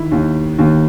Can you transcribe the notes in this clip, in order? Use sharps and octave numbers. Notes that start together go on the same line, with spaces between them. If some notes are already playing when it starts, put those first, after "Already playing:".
Already playing: D#3 E4
D#2
D#2